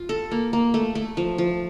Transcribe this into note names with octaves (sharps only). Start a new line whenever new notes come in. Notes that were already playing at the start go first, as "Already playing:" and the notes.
Already playing: F4
A4
A#3
A#3
A3
A3
F3
F3